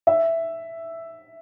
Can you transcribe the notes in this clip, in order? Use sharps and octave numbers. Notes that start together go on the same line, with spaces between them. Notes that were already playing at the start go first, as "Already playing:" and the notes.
E5